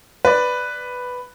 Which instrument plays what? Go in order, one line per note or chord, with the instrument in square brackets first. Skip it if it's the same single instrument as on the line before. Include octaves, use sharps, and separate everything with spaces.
[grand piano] B4 D5